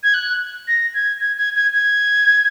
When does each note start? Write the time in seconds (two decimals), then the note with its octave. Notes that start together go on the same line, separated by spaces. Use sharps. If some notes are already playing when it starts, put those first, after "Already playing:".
0.03 G#6
0.14 F#6
0.68 A#6
0.94 G#6
1.20 G#6
1.37 G#6
1.55 G#6
1.73 G#6